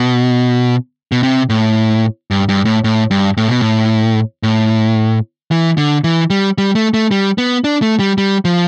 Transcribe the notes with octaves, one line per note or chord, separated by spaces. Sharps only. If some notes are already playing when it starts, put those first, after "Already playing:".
Already playing: B2
B2
C3
A2
G2
G2
A2
A2
G2
A2
B2
A2
A2
E3
D3
E3
G3
G3
A3
A3
G3
B3
D4
A3
G3
G3
F3